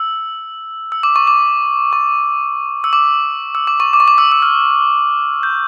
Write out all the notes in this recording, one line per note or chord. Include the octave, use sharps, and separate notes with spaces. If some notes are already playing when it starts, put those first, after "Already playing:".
Already playing: E6
E6
D6
C#6
D6
C#6
E6
D6
E6
D6
C#6
D6
C#6
D6
E6
E6
F6
G6